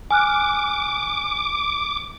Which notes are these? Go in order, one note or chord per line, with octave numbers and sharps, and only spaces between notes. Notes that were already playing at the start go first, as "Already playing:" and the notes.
G#5 D6 F6 F#6